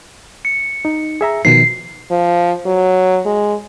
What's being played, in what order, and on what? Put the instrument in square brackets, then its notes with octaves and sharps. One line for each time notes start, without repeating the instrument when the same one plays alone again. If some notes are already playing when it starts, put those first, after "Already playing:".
[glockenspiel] C#7
[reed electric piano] D#4
G#4 E5 A#5
[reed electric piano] B2 D#3 F3 [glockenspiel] C7
[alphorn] F3
F#3
G#3